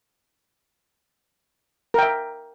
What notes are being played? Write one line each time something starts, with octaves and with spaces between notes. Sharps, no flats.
A#4 E5 G5